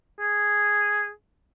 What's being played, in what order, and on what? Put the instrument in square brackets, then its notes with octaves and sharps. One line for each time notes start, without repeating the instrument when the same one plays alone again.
[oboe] G#4